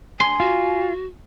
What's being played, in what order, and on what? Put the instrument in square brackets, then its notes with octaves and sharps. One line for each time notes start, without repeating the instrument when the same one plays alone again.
[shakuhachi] G#5 [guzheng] C6
[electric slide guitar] F4 [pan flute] F#4